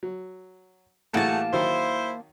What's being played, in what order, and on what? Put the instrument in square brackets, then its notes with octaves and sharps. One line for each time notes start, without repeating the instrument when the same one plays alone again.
[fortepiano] F#3
[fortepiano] A2 E3 G3 [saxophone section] A3 F#4 G#4 [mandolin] A#3 A5
[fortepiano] D#3 F#3 D#4 [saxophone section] E4 C5